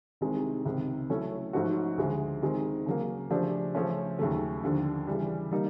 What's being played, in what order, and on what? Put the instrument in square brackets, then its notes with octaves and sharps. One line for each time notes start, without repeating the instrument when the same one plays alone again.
[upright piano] C2 C3 D#3 G#3
C#2 C3 D#3
F#3 A3 C#4 E4 A4
G#2 F3 A3 C#4 F#4
D2 C#3 F3 G#3
D#3 G#3 C4
C#3 F#3 A#3
C#3 F3 A3 D4 G4
C#3 F3 A3 C#4
D#2 C#3 F#3 A3
D#2 D3 F3
C#3 E3 G3
G3 A#3 D#4